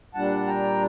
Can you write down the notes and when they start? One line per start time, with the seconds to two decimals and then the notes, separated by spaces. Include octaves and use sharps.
0.14 A#2 G3 D4 F#5 A5
0.47 G5 A#5